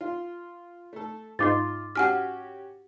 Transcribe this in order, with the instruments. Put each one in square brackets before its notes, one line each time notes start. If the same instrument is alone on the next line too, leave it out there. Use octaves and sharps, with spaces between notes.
[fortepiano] F4
A3 A4
[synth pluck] G#2 D#4 C6 [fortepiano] F4 [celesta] D6 A6
[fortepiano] C#4 F#4 G4 [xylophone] F#5 G#5 F6